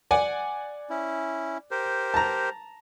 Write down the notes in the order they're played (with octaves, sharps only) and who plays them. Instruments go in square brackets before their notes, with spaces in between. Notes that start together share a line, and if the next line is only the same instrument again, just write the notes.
[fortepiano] D5 F#5 G#5
[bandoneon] C#4 E4
G4 A#4 C5
[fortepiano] A5 A#5